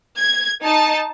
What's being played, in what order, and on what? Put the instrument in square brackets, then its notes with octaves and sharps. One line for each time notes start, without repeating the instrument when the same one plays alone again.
[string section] G#6
D#4 A5